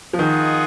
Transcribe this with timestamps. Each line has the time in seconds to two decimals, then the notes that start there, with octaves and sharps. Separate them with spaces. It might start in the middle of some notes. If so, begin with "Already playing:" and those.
0.13 F3
0.19 D#3 F4 G#4 D#5 F#5